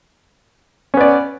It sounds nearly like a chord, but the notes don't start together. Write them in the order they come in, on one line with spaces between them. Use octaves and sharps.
C#4 B3 D5